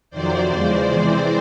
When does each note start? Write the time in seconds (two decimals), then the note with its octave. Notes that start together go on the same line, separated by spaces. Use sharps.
0.10 F2 C3 D#3 F#3 C5 D5
0.49 E2 C#3 F3 G#3 C5 D5
0.87 C3 E3 G#3 C4